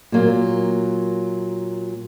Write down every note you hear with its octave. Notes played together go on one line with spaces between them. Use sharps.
A#2 F#3 A#3